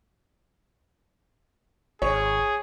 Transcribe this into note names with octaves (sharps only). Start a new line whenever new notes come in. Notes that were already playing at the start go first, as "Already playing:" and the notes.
G#1 G#4 C#5